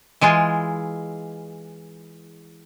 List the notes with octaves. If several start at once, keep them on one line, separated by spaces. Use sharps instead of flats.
E3 G#3 F4 G#4